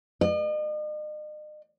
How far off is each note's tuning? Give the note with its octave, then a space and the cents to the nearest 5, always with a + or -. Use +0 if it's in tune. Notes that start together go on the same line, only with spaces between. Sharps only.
D#5 -40